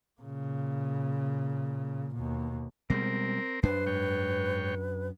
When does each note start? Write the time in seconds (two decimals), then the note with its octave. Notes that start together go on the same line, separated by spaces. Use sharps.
0.21 A#2 C#3
2.15 D#2 B2
2.90 B2 G3 G#3 C4 A#4
3.63 F#2 D4 B4 C5
3.87 G#2 C#5 G5